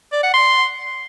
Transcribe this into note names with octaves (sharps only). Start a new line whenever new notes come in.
D5
F#5
C6